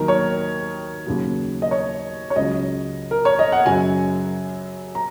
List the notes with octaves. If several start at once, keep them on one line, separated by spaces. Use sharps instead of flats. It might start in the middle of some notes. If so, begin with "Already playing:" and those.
Already playing: D#2 D#3 F#3 A#4
C#5
D#2 C#3 F#3
D#5
C#5
C#5
C#2 C#3 F#3 D#5
A#4
C#5
D#5
F#5
F#2 C#3 F#3 G#5
A#5